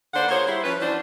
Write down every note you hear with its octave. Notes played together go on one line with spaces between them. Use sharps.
D3 A#3 B4 C5 D5 F#5
A#3 F4 G#4 C5 C#5
G3 E4 C5
F3 C#4 B4
E3 F#3 C#4 D4 E4 C5